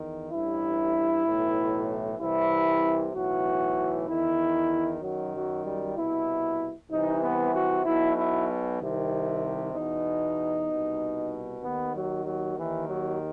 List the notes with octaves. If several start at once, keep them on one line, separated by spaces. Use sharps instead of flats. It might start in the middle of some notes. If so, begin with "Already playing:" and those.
Already playing: E2 D#3
A1 G2 E3 E4
B1 A2 E3
C2 C3 E3 E4
B1 A2 E3 F#4
E2 D#3 E4
F#2 D#3 F#3
F#3
G3
C2 B2 E4
C2 C3 E3 D#4
B3
F#4
B1 B2 E4
E4
C2 C3 D#3
E2 B2 D#4
C2 B2
D#2 D#3 B3
F#3
F#3
D#2 D#3 E3
F#3